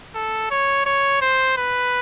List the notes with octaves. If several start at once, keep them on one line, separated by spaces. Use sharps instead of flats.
A4
C#5
C#5
C5
B4